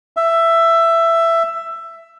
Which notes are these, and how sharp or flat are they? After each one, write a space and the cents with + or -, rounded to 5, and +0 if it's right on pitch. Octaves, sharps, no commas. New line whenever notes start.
E5 +10